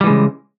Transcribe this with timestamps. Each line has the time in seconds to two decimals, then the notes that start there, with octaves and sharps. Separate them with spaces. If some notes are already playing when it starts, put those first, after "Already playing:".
0.01 G3
0.04 E3
0.07 G#3
0.10 C#3